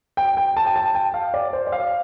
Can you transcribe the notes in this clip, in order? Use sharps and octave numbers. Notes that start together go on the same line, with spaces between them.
G5
G5
A5
G5
A5
G5
F5
D5
C5
D5
F5